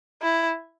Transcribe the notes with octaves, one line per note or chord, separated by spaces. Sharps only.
E4